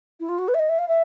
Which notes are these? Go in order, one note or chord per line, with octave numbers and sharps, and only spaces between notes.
E4
F4
F#4
B4
E5
D#5
E5
F5
E5